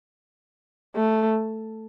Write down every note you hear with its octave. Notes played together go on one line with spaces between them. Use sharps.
A3